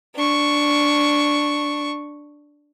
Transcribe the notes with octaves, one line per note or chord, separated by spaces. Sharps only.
D4 C#6